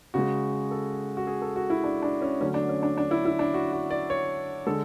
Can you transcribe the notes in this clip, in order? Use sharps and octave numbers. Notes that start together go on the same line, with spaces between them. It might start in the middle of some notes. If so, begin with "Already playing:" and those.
C#3 G#3 F#4
A4
F#4
G#4
A4
F#4
E4
D4
D4
C#4
D3 F#3 A3 C#4
D4
C#4
D4
D4
E4
E4
D4
F#4
F#4
D5
C#5
D3 G#3 A4